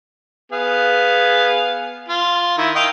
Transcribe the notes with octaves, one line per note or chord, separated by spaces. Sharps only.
B3 G#4 F5
F4
D#3 E4
D#5 F5 G5